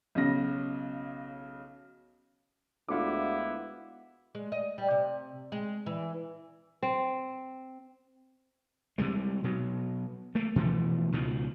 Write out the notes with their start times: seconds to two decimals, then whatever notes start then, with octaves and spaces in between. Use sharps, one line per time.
0.15 B1 C#3 A#6
2.89 D2 G#3 B3 E4 F4 D6
4.35 G#3
4.52 D#5
4.78 G3
4.91 C3
5.52 G#3
5.86 E3
6.82 C4
8.98 C3 G3 G#3
9.44 B2 F#3
10.35 A3 A#3
10.56 B2 E3 F3 A3
11.12 C#2 B2 D#3 F3